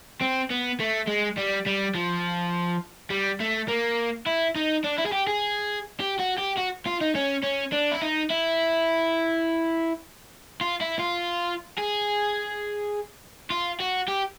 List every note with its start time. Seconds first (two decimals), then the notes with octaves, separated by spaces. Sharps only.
0.22 C4
0.51 B3
0.80 A3
1.08 G#3
1.38 G3
1.66 G3
1.95 F3
3.10 G3
3.40 A3
3.68 A#3
4.26 E4
4.56 D#4
4.84 D4
4.98 E4
5.06 G#4
5.12 G4
5.27 G#4
6.00 G4
6.19 F#4
6.38 G4
6.57 F#4
6.86 F4
7.01 D#4
7.15 C#4
7.44 C#4
7.73 D4
7.92 E4
8.02 D#4
8.31 E4
10.61 F4
10.81 E4
11.00 F4
11.78 G#4
13.50 F4
13.80 F#4
14.08 G4